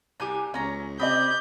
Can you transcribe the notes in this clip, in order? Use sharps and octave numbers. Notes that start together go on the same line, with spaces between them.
C2 G4 G#5 G6
C#2 C#4 C#5 A#5
C3 D5 D#5 B5 D6 D#6 G6